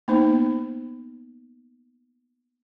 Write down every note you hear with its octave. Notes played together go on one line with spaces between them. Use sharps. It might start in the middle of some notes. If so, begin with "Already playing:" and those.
A#3 B3 D#4 C5